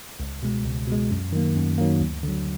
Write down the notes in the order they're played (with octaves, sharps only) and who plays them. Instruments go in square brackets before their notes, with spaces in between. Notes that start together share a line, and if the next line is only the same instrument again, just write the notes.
[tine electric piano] C#2
B2 G#3
C#2
B2 G#3
F#2
D#3 F#3 A#3
F#2
D#3 F#3 A#3
D2
D3 F#3